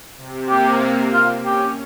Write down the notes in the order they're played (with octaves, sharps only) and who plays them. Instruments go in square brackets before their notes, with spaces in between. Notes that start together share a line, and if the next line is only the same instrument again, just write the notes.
[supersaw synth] C3
[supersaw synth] A#3 [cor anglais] G4
[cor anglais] F4
[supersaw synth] C#4 [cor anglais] G4